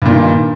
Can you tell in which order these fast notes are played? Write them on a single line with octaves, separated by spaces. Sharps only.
G2 A#2 D#3